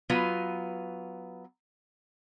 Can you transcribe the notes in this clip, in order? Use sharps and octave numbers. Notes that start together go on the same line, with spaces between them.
F#3 B3 F4 B4